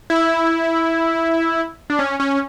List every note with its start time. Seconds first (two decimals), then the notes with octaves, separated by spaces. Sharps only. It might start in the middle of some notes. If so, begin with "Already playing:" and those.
0.10 E4
1.90 D4
1.99 C#4
2.20 C#4